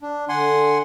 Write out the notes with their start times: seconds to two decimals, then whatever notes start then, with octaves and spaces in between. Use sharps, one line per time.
0.01 D4
0.29 D3 F#5 G#5 C6